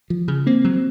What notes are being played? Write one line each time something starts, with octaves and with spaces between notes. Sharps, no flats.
F3
C#3
A#3 C4
F#3